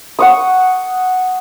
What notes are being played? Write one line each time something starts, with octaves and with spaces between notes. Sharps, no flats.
F#5 C#6 D#6